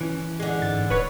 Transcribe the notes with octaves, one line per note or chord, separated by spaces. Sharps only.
E3 C#4
D3 G#3
G#2 A6
D#1 B4 C#5